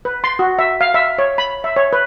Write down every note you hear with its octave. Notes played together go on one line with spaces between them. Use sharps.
B4
C6
F#4
E5
F5
E5
C#5
B5
E5
C#5
B4